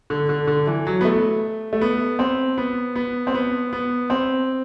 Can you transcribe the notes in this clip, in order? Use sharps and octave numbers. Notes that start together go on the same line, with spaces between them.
D3
D3
D3
E3
F#3
B3
A3
A3
B3
C4
B3
B3
C4
B3
B3
C4